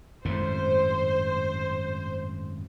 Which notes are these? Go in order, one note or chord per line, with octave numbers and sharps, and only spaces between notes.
G#1 F#2 A2 C5